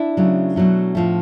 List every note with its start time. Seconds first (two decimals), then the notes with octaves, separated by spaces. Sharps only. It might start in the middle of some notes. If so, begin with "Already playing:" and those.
Already playing: D4 E4
0.17 C#3 F#3 A3
0.56 B2 F#3 A3
0.95 A2 F3 A3